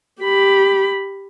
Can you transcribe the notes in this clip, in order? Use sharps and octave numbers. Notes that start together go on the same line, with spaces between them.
G4 B5